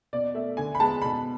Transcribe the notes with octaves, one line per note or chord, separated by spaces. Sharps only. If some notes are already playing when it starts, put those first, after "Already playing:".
B2 D5
A3 E5
D3 G#5
B5
G#3 B3 A5
B2 B5